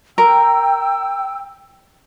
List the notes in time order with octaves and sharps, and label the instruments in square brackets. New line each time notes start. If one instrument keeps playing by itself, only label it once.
[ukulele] A#4 [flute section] G5 E6